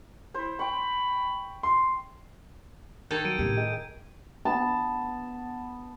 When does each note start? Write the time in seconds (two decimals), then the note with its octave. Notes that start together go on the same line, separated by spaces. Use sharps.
0.34 E4 C5
0.59 G5 B5 C#6
1.63 C6
3.11 D#3 A4 G6 G#6
3.25 F#3 D7 D#7
3.39 A2 C#4 G4
3.57 G#4 D#5 G5
4.45 B3 A5